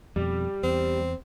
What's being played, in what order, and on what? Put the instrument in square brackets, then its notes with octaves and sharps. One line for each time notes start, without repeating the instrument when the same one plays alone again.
[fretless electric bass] F2 B2 [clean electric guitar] G3
[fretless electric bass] E2 [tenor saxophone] C4